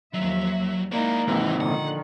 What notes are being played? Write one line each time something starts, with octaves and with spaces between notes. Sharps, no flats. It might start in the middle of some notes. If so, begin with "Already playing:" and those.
D#2 F3 F#3 E5
G#3 A#3 D#4 E4 D5
G#2 C3 E3
A#2 D3 D#3 F3 F#5